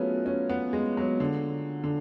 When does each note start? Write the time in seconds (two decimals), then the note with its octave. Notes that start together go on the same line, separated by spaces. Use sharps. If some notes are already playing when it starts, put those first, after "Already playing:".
Already playing: F#3 A3 B3 C#4 F4 G#4 B4
0.26 C#4
0.49 B3
0.73 G#3
0.97 F#3
1.20 D3
1.84 D3